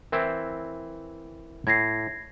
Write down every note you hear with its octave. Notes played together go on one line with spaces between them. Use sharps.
E3 C4 E4 A#4
A2 G#6 A#6 C7